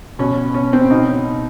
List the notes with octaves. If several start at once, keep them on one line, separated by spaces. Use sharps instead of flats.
B2 C#4
C#4
C4
B2 D#4